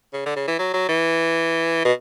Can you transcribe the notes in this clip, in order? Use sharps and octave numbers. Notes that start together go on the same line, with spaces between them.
C#3
D3
C#3
E3
F#3
F#3
E3
B2